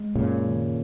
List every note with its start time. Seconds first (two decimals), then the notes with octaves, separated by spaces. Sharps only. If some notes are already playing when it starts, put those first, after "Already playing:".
Already playing: G#3
0.15 F#2 A#2 C#3
0.45 D#3